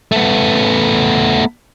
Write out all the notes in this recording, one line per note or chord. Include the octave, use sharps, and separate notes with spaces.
A3 B3